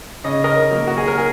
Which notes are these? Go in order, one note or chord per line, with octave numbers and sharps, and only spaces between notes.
C#3 D#5
A#4 D#5
F#3 A#3
F#4
G#4
A#4
G#4